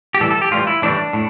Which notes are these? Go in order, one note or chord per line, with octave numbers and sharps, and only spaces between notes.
G4
A2 E3 G3 A4
A4
G4
A2 E3 G3 F4
E4
A2 E3 G3 D4
A2